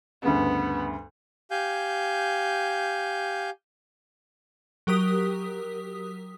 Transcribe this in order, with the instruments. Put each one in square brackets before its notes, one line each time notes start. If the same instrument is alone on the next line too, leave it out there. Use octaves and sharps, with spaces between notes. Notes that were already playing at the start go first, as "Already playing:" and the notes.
[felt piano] D2 G2 C#3 [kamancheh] B3
[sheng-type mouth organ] G4 F5 G#5 G6
[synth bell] F#3 G4 A#4 D#6 B6